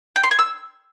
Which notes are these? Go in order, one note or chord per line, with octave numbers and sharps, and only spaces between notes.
G5
C6
G#5
E6